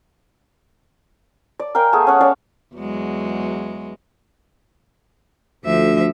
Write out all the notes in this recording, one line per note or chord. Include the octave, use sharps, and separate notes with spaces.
D5
A#4 F5 G5 G#5
A3 B3 G#4
C#4 F#5
C#4 C#5 D5 F5
E2 F#3 G#3
D2 F3 E5